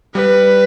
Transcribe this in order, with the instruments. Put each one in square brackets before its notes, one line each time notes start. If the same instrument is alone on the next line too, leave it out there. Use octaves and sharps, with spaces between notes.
[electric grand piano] G3 [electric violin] B4